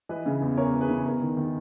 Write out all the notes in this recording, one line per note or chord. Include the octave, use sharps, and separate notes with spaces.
E3 B4 D#5
C#3
E2
E2 A#4 C#5
E3
G#4 B4
C#3
E2 A#4
D#3
D#3